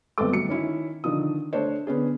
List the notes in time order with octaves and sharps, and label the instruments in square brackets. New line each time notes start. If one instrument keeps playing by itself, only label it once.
[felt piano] G#1 G2 B3 C4 A4 D6
D2 F#3 C#7
D#3 C#4 E4
D3 D#3 F3 D#6
A3 D4 C5 C#5
D3 B3 C#4 G#4